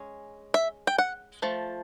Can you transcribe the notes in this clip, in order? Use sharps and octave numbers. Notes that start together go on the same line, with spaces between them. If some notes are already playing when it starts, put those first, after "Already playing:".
Already playing: G#3 C#4
E5
G5
F#5
F3 A3